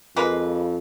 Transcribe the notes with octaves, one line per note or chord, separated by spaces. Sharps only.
F2 G#3 A#3 B4